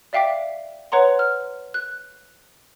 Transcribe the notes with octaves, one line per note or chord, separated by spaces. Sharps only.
D5 E5 F5 G5 D6 B6
B4 C#5 F#5 A#5 C6
F6
F#6